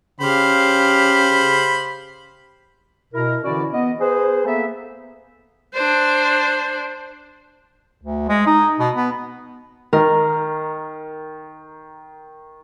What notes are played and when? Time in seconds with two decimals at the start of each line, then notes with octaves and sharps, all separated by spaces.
0.21 C#3 G4 C5 F5 B5
3.14 B2 E4 A#4
3.44 D3 E3 C#4 E4 F#4 D5
3.73 B3 D#5
4.01 G#4 B4 C5
4.46 A#3 B3 A4 E5
5.74 D4 C5
8.02 D2
8.29 G#3
8.47 D#4
8.80 B2
8.95 B3
9.93 D#3 A#4